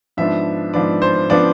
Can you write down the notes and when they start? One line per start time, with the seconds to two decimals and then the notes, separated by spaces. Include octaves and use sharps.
0.17 G#2 F3 B3 D4 E5
0.73 G#2 F3 B3 D4 D5
1.02 C5
1.30 F3 B3 D4 D5